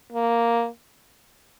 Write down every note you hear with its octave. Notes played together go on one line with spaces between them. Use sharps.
A#3